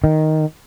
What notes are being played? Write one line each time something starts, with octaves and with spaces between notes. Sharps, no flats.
D#3